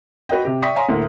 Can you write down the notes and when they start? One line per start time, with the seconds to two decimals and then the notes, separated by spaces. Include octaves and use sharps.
0.29 F#4 B4 D#5 G5
0.45 C3 G4
0.62 D5 E5 G5 C#6 D#6 B6
0.75 C#5 F5 G#5 A#5 C6
0.89 D2 A2 A#3